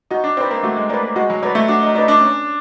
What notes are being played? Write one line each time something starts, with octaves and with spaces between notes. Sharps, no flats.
D#4 F#4
D4
C4 B4 D5
A#3
A3 F#4
G#3
A#3 B4 D5
A#3
G#3 F#4
F#3
F#3 B4 D5
A3
D4 F#4
D#4
D#4 B4 D5
D4
C#4